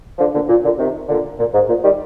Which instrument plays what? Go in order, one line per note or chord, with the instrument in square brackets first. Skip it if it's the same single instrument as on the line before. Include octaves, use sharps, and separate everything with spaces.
[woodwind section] D3 F3
A#2 D3
A#2
A#2 D3
C3 D#3
A#2 D3
A#2
G#2
A#2
D#3 G3